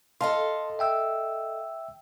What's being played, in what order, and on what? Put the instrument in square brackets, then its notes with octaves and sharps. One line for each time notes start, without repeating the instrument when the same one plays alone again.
[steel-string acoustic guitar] A4 D#5 F5 [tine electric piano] A5 C6
[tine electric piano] E5 G5 E6